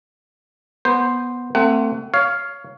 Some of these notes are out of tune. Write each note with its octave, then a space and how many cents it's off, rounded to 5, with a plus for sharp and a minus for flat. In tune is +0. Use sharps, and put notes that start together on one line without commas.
B3 -10 C5 +0
A3 +40 C4 +0 F#5 +25
C#5 +20 F5 +0